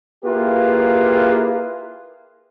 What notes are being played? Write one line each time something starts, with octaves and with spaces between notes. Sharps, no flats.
A#3 E4 F4 G4 G#4 B4